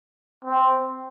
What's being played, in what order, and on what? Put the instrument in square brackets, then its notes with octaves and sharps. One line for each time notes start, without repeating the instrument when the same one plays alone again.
[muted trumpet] C4